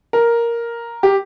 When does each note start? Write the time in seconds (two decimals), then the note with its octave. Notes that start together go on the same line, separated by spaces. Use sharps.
0.13 A#4
1.03 G4